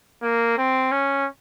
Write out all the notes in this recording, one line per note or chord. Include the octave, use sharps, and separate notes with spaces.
A#3
C4
C#4